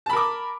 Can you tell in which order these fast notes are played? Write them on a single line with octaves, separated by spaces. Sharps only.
A5 B5 A#4 D6